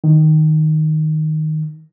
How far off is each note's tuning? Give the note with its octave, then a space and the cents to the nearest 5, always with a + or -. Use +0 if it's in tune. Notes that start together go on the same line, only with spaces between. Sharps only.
D#3 +0